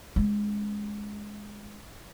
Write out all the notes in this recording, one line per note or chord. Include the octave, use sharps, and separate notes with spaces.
G#3 C#4